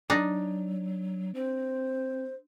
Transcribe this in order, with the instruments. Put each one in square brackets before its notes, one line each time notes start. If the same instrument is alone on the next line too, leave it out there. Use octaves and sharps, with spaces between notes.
[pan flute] F#3 [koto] D4 D#4
[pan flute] C4 [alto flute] C5